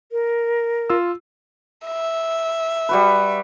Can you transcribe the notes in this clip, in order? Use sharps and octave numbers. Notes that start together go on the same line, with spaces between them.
A#4
F4 E6
E5
G3 F#4 B4